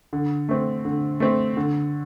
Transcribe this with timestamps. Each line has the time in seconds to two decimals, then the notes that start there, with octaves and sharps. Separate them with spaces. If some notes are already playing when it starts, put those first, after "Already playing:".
0.13 D3
0.49 A3 C4
0.85 D3
1.20 A3 C4
1.57 D3